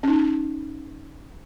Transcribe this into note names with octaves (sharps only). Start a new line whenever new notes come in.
C#4 D#4